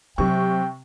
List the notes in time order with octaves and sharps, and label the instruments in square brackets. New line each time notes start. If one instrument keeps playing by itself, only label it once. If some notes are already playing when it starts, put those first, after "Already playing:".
[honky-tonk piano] C3 C#6 [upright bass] F#3 [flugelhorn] G5